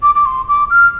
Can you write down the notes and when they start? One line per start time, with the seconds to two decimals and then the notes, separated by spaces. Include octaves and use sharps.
0.02 D6
0.14 D6
0.25 C6
0.48 D6
0.70 F6